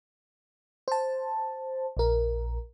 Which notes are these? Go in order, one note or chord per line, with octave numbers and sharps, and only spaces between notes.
C5 A5
A#1 A#4